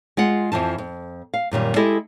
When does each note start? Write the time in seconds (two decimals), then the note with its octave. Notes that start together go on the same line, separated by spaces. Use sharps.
0.17 G#3 F4 F#5
0.52 F2 E3 F3 A5
0.78 F2
1.34 F5
1.51 F#2 A#2 D#3 G3
1.76 G#3 E4 G4 A4 D#5